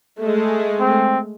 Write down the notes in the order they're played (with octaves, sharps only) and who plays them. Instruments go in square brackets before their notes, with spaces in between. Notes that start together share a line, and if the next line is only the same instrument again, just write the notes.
[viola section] G#3 A3
[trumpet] C4